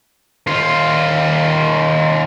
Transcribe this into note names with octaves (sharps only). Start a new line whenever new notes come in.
D#2 F4